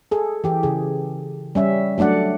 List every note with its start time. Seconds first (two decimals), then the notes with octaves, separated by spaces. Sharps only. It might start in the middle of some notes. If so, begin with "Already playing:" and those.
0.11 G#4 A4
0.44 E3 G4
0.63 C#3 G#4
1.55 G3 C#4 E5
1.98 F#3 A3 D4 D5 F#5